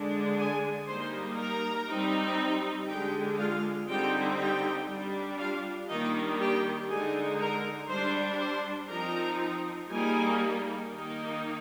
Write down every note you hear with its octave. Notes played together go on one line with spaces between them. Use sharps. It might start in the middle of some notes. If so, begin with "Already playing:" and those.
Already playing: D3 G#3 D4
G#4 G#5
G3 A#3 D#4 C5 C6
A#4 A#5
G3 C4 D#4
D3 G#3 D4 G4 G5
F4 F5
D3 G3 C4 D#4 G4 G5
G4 G5
G3 D4
F4 F5
D#3 G3 A#3 D4 D#4 D#5
G4 G5
D3 G#3 D#4 G#4 G#5
A#4 A#5
G3 D4 C5 C6
C5 C6
F3 C4 D#4 A#4 A#5
G3 A#3 D#4 G#4 G#5
D#3 A#3 D#4